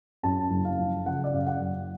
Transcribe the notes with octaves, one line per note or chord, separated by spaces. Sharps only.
F#2 A5
F#1
F5
F3
C#3 F#5
D5
F#2 F5
F#5
F#1